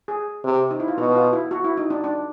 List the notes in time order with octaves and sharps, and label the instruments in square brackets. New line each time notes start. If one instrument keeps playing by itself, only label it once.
[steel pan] G#4
[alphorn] C3
[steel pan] D#4
E4
F4
[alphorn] B2 [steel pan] F#4
[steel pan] F4
E4
F#4
E4
D#4
D4
D4